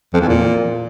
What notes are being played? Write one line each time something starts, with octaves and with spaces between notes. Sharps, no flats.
F2
E2
A#2